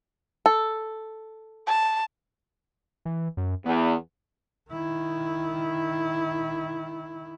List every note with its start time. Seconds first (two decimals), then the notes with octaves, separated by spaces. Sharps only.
0.46 A4
1.67 A5
3.05 E3
3.37 F#2
3.66 E2 B3
4.71 D#3 E4